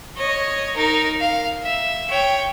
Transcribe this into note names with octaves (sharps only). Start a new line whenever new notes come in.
C#5 D#5
D#4 A#4
F5
E5
C#5 G5